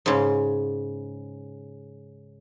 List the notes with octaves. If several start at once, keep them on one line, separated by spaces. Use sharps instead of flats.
G#2 C#3